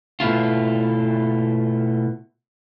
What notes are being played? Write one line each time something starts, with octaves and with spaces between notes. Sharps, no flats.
B2 A3 E4 F4